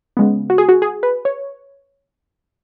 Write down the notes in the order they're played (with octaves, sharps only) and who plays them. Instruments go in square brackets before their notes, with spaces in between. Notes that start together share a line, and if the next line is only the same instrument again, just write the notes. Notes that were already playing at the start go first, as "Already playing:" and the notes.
[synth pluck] C#3 G#3 B3
F#4
G#4
F#4
G#4
B4
C#5